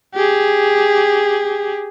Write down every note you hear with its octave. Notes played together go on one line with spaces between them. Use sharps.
G4 G#4